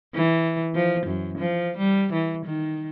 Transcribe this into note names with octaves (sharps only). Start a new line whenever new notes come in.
E3
F3
F#2
F3
G3
E3
D#3